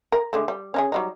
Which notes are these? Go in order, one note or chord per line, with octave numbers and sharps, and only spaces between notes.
A#4
D3 G#3 A3
G3
C#4 D#4 G#4
F#3 G3 D#4